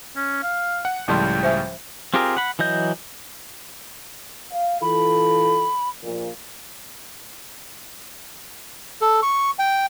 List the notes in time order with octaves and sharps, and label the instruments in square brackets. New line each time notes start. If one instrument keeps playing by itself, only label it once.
[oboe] C#4
F5
[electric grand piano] F#5
[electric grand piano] C#2 A2 G3 [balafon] F3 A5 C6 [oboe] G5
[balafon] C5 E5 G#5
[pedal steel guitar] C4 F4 G4 G#4 A#4
F#5 B5
E3 F#3 D#5 G6
[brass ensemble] F5
[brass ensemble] E3 F4 A4 [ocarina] B5
[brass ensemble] A#1 A#2
[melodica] A4
C#6
G5